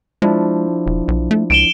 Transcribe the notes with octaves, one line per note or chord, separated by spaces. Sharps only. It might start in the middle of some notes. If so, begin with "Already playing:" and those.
F3 G#3 D4 E4
E1
B1
A3
C#2 D7 E7 G7